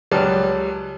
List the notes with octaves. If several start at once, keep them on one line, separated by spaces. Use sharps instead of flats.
C#2 F#3 G3 A5 F6